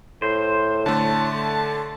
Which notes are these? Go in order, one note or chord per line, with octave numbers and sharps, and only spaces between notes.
A2 C5
D3 A3 A5